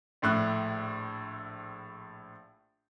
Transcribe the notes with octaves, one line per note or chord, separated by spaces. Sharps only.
A#1 A2 F#6